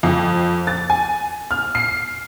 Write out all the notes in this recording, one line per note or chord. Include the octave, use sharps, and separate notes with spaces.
F2
A6
G#5
F6
C7